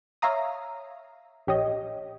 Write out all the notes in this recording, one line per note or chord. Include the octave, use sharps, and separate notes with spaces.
C#5 E5 F5 A#5 D#6
A#1 G4 C#5 D#5